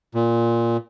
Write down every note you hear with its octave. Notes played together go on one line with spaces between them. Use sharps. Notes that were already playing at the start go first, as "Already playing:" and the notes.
A#2